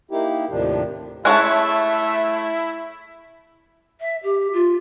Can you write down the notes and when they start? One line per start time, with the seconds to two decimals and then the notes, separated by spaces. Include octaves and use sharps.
0.11 A#3 D#4 E4 G4
0.50 D#2 A2 C3 D#3 F3 D4
1.25 G#3 A3 C#4 E4 E5 A5 C#6 F#6
4.00 E5
4.23 G4
4.53 F4